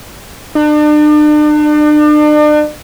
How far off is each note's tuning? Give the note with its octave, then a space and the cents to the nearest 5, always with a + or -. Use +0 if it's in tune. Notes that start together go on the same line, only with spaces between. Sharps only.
D4 +40